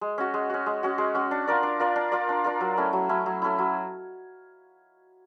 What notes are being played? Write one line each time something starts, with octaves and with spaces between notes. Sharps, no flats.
G#3
C#4 F#4
G#3
C#4 F#4
G#3
C#4 F#4
G#3
C#4 F#4
D4
F4 A#4 D5
D4
F4 A#4 D5
D4
F4 A#4 D5
D4
F4 A#4 D5
F#3
A3 C#4 E4
F#3
A3 C#4 E4
F#3
A3 C#4 E4
F#3